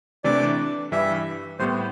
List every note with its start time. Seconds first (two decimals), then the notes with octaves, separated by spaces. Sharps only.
0.24 C3 E3 A3 D4 A4 D5
0.92 G2 E3 G3 E5
1.59 A2 G3 B3 C5